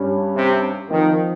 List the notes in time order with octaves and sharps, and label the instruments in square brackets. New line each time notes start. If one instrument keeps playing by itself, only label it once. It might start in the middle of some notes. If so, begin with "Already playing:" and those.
Already playing: [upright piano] G2 G3 C#4
[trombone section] C3
[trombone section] D#3 [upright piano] F3 C4 D#4